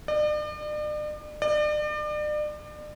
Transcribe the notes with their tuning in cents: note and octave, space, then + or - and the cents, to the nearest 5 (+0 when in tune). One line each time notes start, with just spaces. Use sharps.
D5 +40
D5 +35